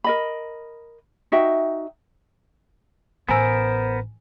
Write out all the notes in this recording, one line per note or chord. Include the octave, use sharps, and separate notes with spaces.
A#4 D#5 B5
D#4 F#4 E5 G5
A1 B3 A#4 C5 G#5 A#5 E6